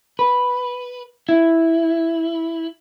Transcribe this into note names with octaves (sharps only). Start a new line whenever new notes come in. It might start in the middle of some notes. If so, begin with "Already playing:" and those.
B4
E4